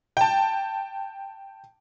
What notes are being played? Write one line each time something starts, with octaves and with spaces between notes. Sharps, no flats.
G5 A5